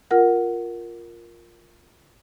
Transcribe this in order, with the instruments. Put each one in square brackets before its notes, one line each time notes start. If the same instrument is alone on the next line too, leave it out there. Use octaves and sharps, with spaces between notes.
[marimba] F4 A#4 F#5